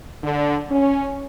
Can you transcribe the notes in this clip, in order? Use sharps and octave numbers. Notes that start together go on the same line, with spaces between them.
D3
C#4